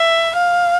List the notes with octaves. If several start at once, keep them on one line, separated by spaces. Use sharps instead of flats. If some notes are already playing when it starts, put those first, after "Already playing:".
Already playing: E5
F5